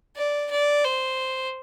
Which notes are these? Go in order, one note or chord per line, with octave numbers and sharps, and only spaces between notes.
D5
D5
C5